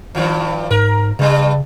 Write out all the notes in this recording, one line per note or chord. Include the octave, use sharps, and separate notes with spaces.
G2 D#3 F3
G#2 A#4
G2 C#3 G3